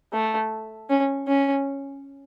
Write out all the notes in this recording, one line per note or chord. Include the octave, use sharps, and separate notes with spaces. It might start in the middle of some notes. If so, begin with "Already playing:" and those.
A3
C#4
C#4